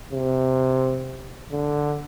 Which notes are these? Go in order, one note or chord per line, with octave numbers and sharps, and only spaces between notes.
C3
D3